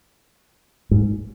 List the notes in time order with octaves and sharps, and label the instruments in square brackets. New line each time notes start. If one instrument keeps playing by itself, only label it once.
[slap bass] G#2